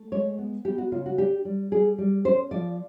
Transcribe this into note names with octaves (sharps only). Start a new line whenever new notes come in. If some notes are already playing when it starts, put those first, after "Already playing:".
Already playing: A3
G#3 C#5
B3
B3 G4
F#4
C#3 F4
F#4
D4 G4
G3
G3 G#4
G3
C#4 C5
F3 D5